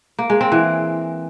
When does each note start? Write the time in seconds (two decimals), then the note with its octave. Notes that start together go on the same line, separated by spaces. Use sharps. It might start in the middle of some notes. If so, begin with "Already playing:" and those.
0.19 A#3
0.30 G#3
0.41 C4
0.52 E3